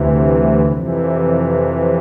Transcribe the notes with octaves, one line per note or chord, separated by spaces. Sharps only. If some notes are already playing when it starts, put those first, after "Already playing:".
Already playing: D2 C3 E3
G3
F2 C3 E3 G3